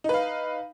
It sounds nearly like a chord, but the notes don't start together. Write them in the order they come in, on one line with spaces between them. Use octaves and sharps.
D#4 B4 F5